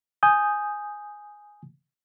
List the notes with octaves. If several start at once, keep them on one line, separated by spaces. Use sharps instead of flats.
G#5 D#6 G6